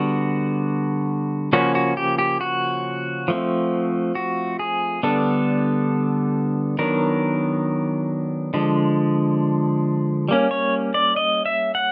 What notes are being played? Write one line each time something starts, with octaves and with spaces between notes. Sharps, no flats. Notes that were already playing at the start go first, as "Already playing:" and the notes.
Already playing: D3 G3 B3 F#4
C#3 F3 A#3 C#4 F#4
F#4
G4
G4
F#4
F3 A3 C4
F#4
G#4
D3 G3 B3 D4 A4
D#3 F#3 B3 D4 A#4
D3 F3 G#3
G3 A#3 C#4
C#5
D5
D#5
E5
F#5